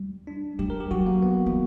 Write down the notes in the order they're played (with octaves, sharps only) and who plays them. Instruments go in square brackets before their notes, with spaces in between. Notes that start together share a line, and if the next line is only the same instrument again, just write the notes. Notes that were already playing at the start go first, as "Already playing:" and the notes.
Already playing: [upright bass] G3
[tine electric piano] D4
[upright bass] G3 [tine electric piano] G4
[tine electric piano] A#4
G4
[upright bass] F#3 [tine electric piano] F#4
[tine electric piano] A#3
B3
[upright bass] E3